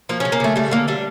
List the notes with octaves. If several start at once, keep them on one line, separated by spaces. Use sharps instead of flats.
F3 A#3
C#3 C#4
A#3
C#3 A3
G3 A3
D3 A#3
G3 D4